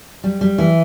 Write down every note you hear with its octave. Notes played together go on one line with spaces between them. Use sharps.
G3
G3
E3